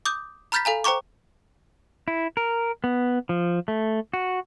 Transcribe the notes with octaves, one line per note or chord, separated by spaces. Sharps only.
D6 D#6 G6
A#5 B5 F6 G6 A6 B6
A4 F5 G#5 A#5
C5 G5 A#5 C#6 D6
E4
A#4
B3
F3
A3
F#4